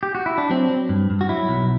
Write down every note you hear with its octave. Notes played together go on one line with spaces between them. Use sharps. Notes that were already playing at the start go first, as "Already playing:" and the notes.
G4
F#4
E4
D4
F#3 C4
F#3
G2
G2
F#4
F#3 E4
B1